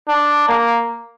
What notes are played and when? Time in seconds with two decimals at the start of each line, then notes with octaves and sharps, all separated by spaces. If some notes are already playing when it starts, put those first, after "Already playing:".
0.08 D4
0.48 A#3